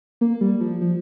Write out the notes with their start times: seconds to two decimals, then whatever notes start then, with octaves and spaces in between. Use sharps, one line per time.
0.21 A#3
0.41 G3
0.60 F3
0.81 F3